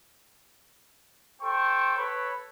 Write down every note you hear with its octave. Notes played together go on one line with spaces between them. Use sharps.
A4 C5 G5 C#6
A4 B4 C#5 B5